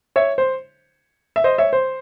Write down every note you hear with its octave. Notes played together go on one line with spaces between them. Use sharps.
C#5 E5
C5
E5
C5 D#5
C#5 E5
C5